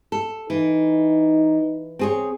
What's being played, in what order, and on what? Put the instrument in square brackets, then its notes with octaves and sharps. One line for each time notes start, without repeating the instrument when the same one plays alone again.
[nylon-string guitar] A4
[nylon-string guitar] E3 [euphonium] D#4
[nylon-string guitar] C4 G#4 C#5